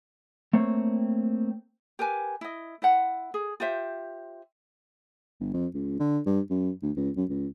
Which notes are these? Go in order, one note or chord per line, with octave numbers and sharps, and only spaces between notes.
A3 A#3 C4 C#5
G4 A#4 B4 G#5
E4 D#5
E4 C5 F#5
G#4
F4 G4 C5 E5
G1
F2
C#2
D3
G2
F#2
D2
C#2
F#2
C#2